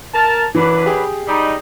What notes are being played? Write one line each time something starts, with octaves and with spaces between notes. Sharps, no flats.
A#4 A5
F#2 E3 D4 B4
G4 G#4
G3 D#4